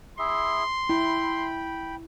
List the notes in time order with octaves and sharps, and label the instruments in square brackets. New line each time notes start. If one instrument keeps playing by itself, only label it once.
[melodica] E4 G#4 E5 [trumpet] C6
[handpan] E4 [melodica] G5 B5